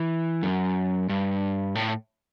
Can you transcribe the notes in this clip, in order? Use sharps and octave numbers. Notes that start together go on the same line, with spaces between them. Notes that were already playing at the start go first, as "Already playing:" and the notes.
Already playing: E3
F#2
G2
A2